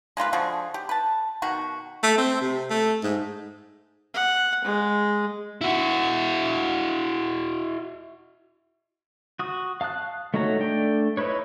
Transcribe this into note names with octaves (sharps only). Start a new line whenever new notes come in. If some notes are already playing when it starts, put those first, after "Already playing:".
G#3 A#3 F4 B4
D3 F3 F#4 G#4
G4
B4 A5
B2 D#3 F#4
A3
C4
C3
A3
G#2
F#5
G#3
E4 F#4
F#4 D#6
F5 A5 D#6 F#6
A3 D#4 F#4 C#5 A#5
A3 D4 G5
D#4 E4 B4 C#5